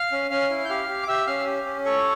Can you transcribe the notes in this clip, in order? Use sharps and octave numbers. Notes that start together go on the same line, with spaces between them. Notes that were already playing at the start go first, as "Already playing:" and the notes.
Already playing: F5 F6
C#4
C#4 F5 F6
E4
G6
G4 F5 F6
G4
D6
G4 E5 E6
C#4 F5 F6
G4
C#4
A4 C#5 C#6